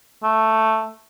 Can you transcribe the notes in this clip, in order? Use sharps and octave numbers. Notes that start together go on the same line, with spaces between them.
A3